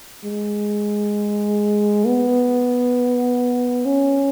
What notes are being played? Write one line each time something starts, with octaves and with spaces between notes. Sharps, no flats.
G#3
B3
C#4